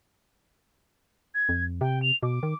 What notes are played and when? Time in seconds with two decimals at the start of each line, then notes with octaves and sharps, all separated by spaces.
1.35 G#6
1.49 F2
1.81 C3 G5
2.02 F7
2.23 B2 D6
2.43 D#3